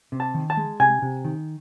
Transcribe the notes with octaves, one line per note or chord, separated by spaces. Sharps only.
C3
A5
D#3
A5
G#3
C3 G#5
C3
D#3